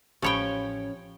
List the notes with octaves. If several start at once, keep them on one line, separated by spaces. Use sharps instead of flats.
A1 F3 C#4 G4 A4 C#5 G5 B5